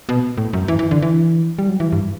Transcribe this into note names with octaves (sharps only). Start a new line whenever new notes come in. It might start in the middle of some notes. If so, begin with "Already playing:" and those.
B2
A2
F#2
E3
E3
D3
E3
G3
F#3
E3
G2